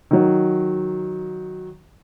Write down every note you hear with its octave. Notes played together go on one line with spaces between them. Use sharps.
D#3 F#3